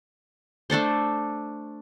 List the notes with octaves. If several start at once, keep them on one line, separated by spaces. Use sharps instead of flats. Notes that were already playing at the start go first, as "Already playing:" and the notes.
A3 D4 A4 C5